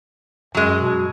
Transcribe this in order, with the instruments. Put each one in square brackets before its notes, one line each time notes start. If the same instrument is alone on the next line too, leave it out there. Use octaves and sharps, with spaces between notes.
[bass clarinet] F#2 [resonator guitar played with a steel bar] F#3 G#3
[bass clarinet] B2